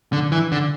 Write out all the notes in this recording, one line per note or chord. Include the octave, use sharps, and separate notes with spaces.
D3
E3
D3